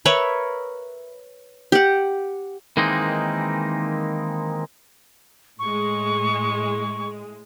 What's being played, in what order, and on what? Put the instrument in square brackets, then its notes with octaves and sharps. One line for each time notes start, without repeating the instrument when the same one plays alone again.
[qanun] A#4 B4 C#5 E5
G4 F#5
[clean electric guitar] D#3 E3 G#3 A#3 C4 D#4
[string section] A2 G#3 [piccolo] C#6